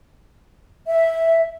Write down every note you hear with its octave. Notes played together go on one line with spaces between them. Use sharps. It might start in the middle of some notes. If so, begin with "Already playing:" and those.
E5